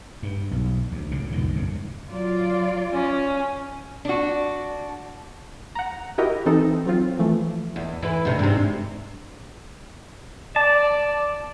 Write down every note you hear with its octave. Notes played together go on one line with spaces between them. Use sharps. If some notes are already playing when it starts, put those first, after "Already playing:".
G2
B1
D2
C#2 A2 C#3
C2 F2 B2 D#3
G1 C#2 F#2 B2
F#3 F4 D5
C#4
D4 F#4
F#5 A#5
E4 F#4 G4 A#4 D#5
E3 C4 D#4 A4
F#3 C4 F4
E3 F3 A3
E2
E3 B4
D2 C3
G#2 C3
D5 A5